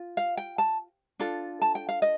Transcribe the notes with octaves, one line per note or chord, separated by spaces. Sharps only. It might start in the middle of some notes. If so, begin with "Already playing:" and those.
Already playing: F4
F5
G5
A5
D4 F4 A4
A5
G5
F5
D#5